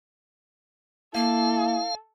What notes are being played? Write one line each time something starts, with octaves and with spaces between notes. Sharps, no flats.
A#3 E4 A4 F5